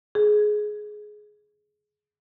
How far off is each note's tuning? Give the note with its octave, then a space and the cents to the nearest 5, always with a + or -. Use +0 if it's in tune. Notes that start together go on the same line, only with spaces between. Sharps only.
G#4 +15